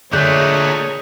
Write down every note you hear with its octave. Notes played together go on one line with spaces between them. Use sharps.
A#2 D3 A3 G#4 C#5 D#5 F#6 G6